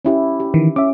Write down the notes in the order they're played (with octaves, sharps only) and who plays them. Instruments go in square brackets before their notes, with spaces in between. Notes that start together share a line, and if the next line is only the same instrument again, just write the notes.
[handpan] C#4 E4 G4
G4
[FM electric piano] D#3 E3
[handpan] C#4 [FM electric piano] E5 D6